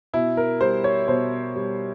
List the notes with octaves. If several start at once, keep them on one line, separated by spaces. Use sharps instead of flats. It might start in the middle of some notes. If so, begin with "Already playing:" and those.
B2 E4
A#4
G3 C5
C#5
B2 C5
G3